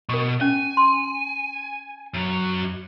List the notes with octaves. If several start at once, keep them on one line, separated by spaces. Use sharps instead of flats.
B2 A#4 C#6
C#4 G#5
C6
F#2 F#3